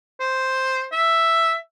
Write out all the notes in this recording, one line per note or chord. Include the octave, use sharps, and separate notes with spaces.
C5
E5